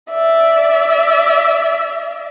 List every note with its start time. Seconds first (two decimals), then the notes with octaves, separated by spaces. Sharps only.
0.11 D5 E5